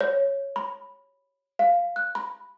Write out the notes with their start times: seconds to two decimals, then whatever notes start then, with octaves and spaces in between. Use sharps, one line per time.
0.01 C#5
0.56 B5
1.59 F5
1.96 F#6
2.15 B5